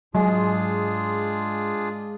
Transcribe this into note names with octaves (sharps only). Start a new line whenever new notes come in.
G#2 F#3 G#3 D4 F4 G#4